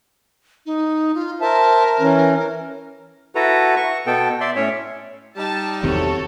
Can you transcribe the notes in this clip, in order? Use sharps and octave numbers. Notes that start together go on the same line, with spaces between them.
D#4
F4
A#4 C5 E5 A5
E3 C#4
E4 F#4 A4 B4 A#5
C#6
B2 B3 A4 G5
D5 E5 C6
A2 C#4 C#5 E5
G3 D#4 A5
E2 C3 D#3 E3 F#4 A4 C#5